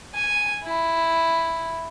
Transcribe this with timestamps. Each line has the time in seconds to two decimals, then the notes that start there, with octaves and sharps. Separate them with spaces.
0.15 G#5
0.65 E4